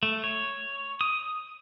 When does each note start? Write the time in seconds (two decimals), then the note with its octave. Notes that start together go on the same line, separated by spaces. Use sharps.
0.03 A3
0.24 C#5
1.01 D#6